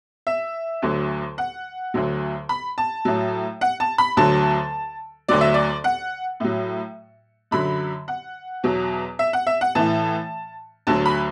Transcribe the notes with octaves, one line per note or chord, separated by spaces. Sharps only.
E5
D2 D3 F#3
F#5
D2 D3 F#3
B5
A5
A2 F#3
F#5
A5
B5
D2 D3 F#3 A5
D2 D3 F#3 D5
E5
D5
F#5
A2 F#3
F#2 D3 F#3 B5
F#5
E2 B2 F#3
E5
F#5
E5
F#5
A2 E3 A5
D2 D3 F#3 A5
B5